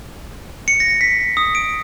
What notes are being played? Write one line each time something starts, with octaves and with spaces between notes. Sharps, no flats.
C#7
A#6
B6
D#6
D7